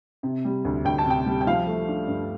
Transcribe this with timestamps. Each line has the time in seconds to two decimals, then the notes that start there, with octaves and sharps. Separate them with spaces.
0.23 C3
0.45 G3
0.65 D2
0.85 D2 G5
0.98 A5
1.06 C3 G5
1.26 G3
1.41 G5
1.47 F3 F5
1.67 A3
1.88 D4
2.08 G2